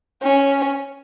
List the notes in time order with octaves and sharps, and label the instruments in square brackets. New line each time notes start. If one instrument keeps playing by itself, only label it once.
[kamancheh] C#4